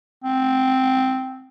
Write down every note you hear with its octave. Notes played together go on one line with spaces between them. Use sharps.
C4